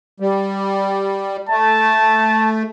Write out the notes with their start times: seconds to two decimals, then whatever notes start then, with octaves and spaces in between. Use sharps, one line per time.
0.20 G3
1.49 A3 A5